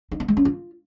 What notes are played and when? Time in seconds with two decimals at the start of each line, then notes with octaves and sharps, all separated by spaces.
0.12 D#4
0.20 B3
0.28 G#3
0.37 C#4
0.45 F4